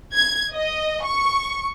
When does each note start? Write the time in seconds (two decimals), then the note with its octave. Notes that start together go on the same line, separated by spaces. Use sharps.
0.13 G#6
0.52 D#5
1.05 C#6